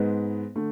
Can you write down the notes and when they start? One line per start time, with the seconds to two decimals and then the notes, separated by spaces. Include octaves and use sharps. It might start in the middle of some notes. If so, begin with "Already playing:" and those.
Already playing: G#2 G#3 B3
0.56 D3 A3